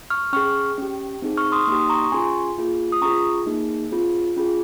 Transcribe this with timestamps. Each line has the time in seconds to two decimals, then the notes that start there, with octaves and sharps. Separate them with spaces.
0.10 C#6 F6
0.33 C#4 G#4 C#6 F6
0.78 C#4 G4
1.22 C4 D#4 G#4
1.37 C#6 F6
1.52 C6 D#6
1.67 A#3 D#4 G4 C6 D#6
1.90 A#5 C#6
2.04 C#6
2.12 C#4 F4 G#4 G#5 C6
2.58 A#3 F4 G#4
2.92 D#6
3.01 C#4 F4 G#4 A#5 C#6
3.46 A#3 D#4 G#4
3.91 C4 F4 G#4
4.36 C#4 F4 G#4